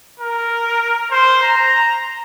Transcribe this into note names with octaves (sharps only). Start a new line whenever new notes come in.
A#4
C5
A#5